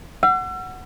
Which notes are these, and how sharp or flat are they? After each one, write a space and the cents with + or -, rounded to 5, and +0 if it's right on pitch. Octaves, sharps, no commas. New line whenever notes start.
F#5 +0 E6 +40